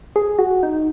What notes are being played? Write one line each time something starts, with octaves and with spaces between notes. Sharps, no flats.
G#4
F#4
D#4